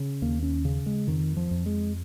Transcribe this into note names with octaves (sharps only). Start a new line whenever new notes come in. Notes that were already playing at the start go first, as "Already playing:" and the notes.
Already playing: C#3
D#2 A#3
C#4
C#3
G#3
F2 D#3
F3
F2
G#3